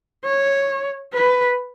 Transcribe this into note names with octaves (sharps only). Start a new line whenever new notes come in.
C#5
B4